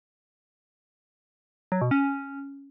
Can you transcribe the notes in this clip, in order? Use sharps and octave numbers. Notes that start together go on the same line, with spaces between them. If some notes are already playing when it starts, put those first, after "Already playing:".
F#3
B2
C#4